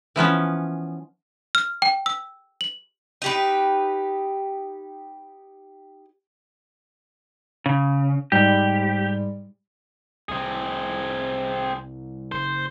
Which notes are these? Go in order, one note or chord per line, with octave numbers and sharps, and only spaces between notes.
E3 F3 B3 C#4
F6
G5
E6
F#7
D#4 G4 B4
C#3
G#2 G3 G4
C2 C4 G#4
F#1 C5